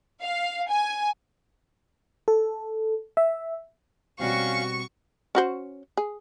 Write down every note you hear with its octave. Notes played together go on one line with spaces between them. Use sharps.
F5
G#5
A4
E5
B2 G3 C4 C#4 F#4 F5 C#6
C#4 F#4 C5
G#4